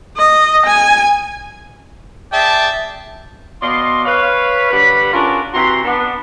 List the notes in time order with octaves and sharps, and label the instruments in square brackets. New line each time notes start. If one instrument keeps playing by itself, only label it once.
[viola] D#5
G#5
[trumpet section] G#4 D5 E5 G5 A5
[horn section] B2 D5 D#5 F5 C6
B4 C#5 F5
D3 G3 B4 B5
C#4 D4 F4 F#4 G#4 A#4
C3 E3 F#4 A#5 C6
B3 D4